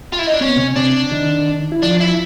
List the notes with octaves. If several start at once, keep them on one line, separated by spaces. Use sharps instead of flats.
F4
E4
D#4
D4
C4 C#4
B3
C3 C4
C3 C4 D4
D#3 D#4
E4
F3 D4 F4
E4